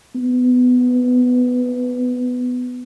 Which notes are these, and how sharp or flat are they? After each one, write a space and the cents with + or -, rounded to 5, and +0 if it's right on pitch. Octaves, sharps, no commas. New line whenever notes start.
B3 +10